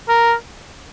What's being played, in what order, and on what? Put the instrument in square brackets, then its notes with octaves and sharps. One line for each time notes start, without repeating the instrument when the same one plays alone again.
[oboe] A#4